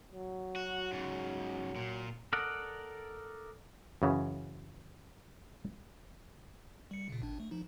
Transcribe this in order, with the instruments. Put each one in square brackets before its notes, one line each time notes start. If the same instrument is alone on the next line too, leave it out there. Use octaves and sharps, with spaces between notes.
[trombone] F#3
[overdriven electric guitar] F#4
G#2 C#3
A#2
[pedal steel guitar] A4 A#4 D5 D#5 F#5
[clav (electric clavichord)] F#2 C#3 E3
[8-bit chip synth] G3 C#7
A#2 C#3
G#1 D4
A3
F3 D#4